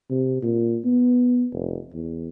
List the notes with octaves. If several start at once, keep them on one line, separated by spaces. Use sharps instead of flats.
C3
A#2
B3
F1
E2